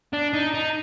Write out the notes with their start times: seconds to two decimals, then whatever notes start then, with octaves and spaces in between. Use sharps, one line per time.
0.13 D4
0.34 D#4
0.54 D#4